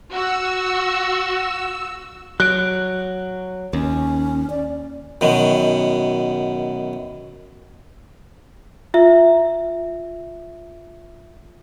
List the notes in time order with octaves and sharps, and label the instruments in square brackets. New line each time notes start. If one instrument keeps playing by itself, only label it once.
[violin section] F#4 [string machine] E6
[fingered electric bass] F#3 [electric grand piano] F#6 D7
[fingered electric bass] D#2 [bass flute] C#4
[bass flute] D5
[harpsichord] F#2 B2 D#3
[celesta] F4 E5